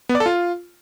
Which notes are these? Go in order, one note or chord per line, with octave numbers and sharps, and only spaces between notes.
B3
D5
A4
F4